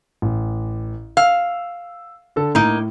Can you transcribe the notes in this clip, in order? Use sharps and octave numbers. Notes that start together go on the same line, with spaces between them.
A1
F5 E6
D3 A4
A2 A#3 D#4